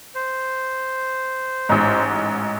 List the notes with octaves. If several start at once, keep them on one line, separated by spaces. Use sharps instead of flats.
C5
A1 G#2